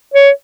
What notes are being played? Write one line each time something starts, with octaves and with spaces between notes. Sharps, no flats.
C#5